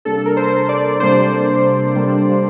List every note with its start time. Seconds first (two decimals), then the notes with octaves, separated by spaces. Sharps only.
0.05 C3 G3 A#3 D4 A4
0.26 A#4
0.37 C5
0.69 D5
1.00 C3 G3 A#3 D4 C5
1.95 C3 G3 A#3 D4